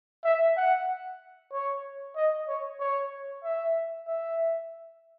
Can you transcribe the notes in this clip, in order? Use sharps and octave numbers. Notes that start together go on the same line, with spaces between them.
E5
F#5
C#5
D#5
C#5
C#5
E5
E5